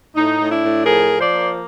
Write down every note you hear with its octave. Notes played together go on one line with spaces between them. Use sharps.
A2 D#4
A2
D4 E4
A2
F3 G#4 A#4
F3
C5 D5
A#3